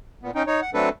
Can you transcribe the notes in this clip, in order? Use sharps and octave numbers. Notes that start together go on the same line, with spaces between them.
A#2 B3
C#4 D#4 G5
D#4 C#5
F#5
F#3 A3 C4 D4 A4 B4